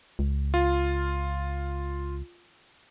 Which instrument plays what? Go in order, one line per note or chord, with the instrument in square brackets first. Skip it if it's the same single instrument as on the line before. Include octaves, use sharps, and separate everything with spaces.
[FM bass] C#2
[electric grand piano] F4